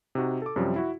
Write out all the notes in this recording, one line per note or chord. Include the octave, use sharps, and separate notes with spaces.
C3 D#4 F#4
A4 D6
F#2 C3 F3 G3
E4 F#4